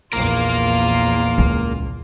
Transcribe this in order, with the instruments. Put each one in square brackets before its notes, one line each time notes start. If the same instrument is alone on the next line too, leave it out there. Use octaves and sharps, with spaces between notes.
[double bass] A#1 E2 [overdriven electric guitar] A#3 A#4 [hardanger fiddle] F4
[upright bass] C#2